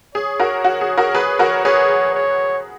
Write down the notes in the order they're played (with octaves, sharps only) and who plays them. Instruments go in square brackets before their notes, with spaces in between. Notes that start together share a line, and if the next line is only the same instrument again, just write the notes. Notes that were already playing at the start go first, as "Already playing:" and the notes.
[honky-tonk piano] G#4 [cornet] C#5
[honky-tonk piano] F#4 A#4
F#4
G#4
F#4 A#4
G#4 B4
F#4 A#4
[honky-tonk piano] G#4 B4 [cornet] C#5
[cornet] C#5